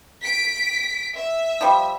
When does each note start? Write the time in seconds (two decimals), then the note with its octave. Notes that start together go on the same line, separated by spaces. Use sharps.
0.23 B6 D7
1.15 E5
1.61 F3 G3